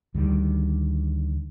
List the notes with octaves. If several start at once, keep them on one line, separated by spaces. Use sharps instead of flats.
D2 D3 D#3 G3